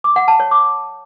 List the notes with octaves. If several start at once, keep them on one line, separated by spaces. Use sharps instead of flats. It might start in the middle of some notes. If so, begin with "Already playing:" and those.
D6
F#5
A5
C#5
D6